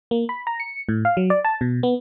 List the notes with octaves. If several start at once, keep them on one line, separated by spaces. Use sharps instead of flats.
A#3
B5
A#5
C#7
A2
F5
F#3
D5
A5
B2
B3